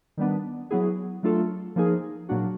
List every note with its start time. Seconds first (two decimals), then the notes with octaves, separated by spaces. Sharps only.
0.17 D#3 G3 B3 D4
0.71 F#3 B3 E4 G#4
1.23 F#3 A3 D4 F4 A4
1.76 F3 A#3 D#4 G#4
2.29 A#2 F#3 A#3 D4 F#4